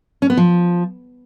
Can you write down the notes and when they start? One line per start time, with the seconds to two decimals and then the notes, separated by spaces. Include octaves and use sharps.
0.22 C#4
0.30 B3
0.37 F3